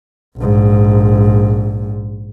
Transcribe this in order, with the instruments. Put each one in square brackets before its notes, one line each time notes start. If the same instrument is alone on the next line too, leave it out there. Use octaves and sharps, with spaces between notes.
[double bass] A#1 G#2